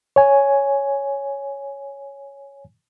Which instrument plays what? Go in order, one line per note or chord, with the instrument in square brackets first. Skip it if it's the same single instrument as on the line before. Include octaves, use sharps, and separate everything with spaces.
[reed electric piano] C#5 G#5